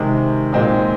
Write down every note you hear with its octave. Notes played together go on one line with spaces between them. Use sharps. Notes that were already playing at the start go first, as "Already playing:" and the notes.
Already playing: C3 D#3 G#3
A#2 G#3 C4 D#4